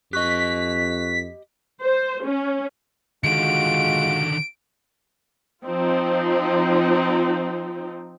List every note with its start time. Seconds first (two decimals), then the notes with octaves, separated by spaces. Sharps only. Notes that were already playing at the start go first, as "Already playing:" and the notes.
0.13 F2 G4 D#5 C#6 F#6 B6
1.83 C5
2.25 C#4
3.24 D3 D#3 G#3 F4 F#4 D7
5.63 F3 C4 D#4 F4